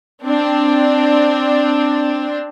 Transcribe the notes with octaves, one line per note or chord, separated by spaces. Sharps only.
C4 D4